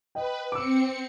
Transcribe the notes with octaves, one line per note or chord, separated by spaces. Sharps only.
B4 D#5 G5
C4 D6 E6 C#7